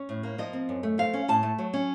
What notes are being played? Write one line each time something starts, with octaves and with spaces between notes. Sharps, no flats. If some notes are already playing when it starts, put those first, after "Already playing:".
Already playing: C#4 C#5
A2
A#3
F3 D#5
C4
F#2
A3
F3 F5
C#4
A2 A5
A3
F#3
C#4